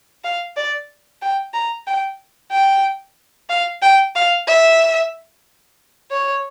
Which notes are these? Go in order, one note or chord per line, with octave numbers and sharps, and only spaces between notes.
F5
D5
G5
A#5
G5
G5
F5
G5
F5
E5
C#5